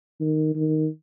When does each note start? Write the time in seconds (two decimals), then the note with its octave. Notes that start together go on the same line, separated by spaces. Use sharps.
0.21 D#3
0.55 D#3